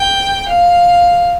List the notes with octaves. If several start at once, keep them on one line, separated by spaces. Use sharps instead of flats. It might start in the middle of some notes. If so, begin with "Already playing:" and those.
Already playing: G5
F5